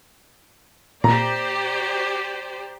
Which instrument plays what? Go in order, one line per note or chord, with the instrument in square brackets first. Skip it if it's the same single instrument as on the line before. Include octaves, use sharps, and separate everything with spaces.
[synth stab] A#2 [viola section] G4 C5 D5 [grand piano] A#5